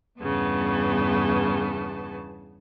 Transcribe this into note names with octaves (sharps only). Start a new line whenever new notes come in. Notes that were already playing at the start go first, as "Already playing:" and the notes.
E2 G2 C#3 B3 A5